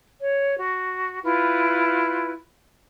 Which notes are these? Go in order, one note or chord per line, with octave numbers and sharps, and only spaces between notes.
C#5
F#4
E4 F4 B4